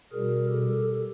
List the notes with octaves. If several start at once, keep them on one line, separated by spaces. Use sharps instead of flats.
B2 G3 G#4 A#4
G4 A4